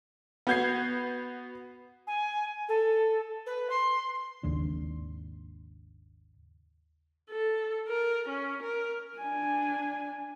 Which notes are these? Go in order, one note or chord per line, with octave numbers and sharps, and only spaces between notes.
B3 F#4 G6 G#6 C7
G#5
A4
B4
C6
G#1 D#2 C#3 D4
A4
A#4
C#4
A#4
D4 G#5